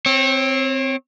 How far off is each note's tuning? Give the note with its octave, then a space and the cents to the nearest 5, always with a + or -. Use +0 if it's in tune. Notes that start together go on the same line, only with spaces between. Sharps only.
C4 +0 C#5 -30